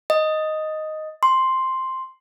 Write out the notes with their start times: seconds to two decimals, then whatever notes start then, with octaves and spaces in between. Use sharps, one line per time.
0.10 D#5
1.23 C6